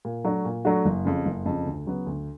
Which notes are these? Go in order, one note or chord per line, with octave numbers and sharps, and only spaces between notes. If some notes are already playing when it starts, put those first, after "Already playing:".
A#2
F#3 A3 D4 F#4
A#2
F#3 A3 D4 F#4
F#1
F2 C#3
F#1
F2 C#3
D2
C#3 F#3 B3
D2